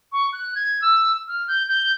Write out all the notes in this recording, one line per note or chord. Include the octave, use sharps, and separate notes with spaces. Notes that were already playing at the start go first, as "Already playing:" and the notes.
C#6
F#6
G#6
E6
F6
G6
G6